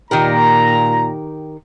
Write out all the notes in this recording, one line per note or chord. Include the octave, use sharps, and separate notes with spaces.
A#2 D#3 G4 A#4 A#5